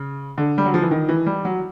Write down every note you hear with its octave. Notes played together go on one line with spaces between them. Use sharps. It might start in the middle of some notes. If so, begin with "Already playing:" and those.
Already playing: C#3
D3
G3
F#3
F3
E3
D#3
E3
G3
F#3